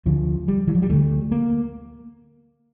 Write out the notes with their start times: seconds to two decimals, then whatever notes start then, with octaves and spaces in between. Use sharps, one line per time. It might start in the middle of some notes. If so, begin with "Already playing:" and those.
0.06 D2 D3 F3
0.48 G3
0.68 E3
0.75 F3
0.82 G3
0.90 D2 D3 A3
1.31 A#3